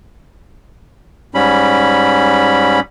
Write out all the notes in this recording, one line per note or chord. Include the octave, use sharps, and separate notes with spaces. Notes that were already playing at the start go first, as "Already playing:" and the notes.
G#2 G3 C#4 B5